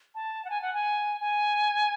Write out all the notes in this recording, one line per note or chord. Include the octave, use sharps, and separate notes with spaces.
A5
F#5
G#5
F#5
G#5
G#5